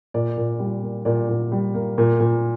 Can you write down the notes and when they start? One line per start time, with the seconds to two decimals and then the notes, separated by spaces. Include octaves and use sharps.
0.14 A#2 D5
0.37 A#2
0.59 G3
0.82 A#3
1.05 A#2 D5
1.29 A#2
1.52 G3
1.74 A#3
1.98 A#2
2.20 A#2